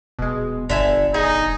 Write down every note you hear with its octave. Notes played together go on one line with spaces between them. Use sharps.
D#1 B2 G#3
G1 D3 E5 G#5
D#4 G#4 G#5